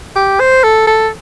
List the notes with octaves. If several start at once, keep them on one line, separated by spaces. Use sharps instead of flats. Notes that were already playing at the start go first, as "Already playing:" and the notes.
G4
C5
A4
A4